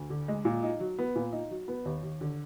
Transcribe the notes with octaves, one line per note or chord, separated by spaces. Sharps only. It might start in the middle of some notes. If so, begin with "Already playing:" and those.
Already playing: D2
D3
G#3
A#2
D#4
F#3
B3
A#2
D#4
F#3
B3
D#2
D#2
D3